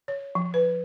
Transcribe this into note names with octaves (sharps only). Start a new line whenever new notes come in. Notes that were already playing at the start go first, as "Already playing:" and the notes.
C#5
F3
B4